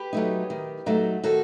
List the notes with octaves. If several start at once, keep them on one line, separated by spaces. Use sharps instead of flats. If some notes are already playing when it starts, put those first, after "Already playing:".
Already playing: G4 B4
F#3 A3 D#4
D#3
F#3 A3 D#4
D#3 F#4 A4